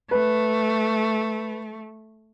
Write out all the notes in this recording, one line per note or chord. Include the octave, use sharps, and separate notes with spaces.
A3 B4